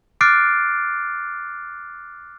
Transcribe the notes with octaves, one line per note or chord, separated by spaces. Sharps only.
D6 F6 F#6 A6 C7 D7